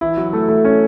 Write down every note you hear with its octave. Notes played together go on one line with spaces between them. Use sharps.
E3 E4
F#3 F#4
A3 A4
A3 A4
C#4 C#5